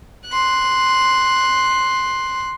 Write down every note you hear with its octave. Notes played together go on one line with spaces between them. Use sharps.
C6 F#6